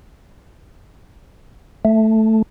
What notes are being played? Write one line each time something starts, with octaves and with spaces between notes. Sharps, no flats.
A3